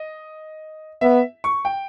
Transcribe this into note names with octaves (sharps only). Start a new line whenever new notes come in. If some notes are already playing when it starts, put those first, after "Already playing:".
Already playing: D#5
B3 E5
C#6
G5